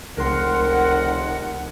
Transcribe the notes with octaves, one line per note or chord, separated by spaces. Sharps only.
F1 C#2 D#3 A#4 F#5 C6